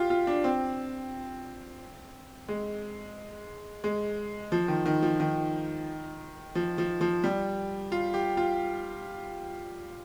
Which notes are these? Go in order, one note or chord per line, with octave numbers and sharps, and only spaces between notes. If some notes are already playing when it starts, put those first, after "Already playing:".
Already playing: F4 G4
F4
D4
C4
G#3
G#3
F3
D#3
D#3
F3
D#3
F3
F3
F3
G3
F4
G4
F4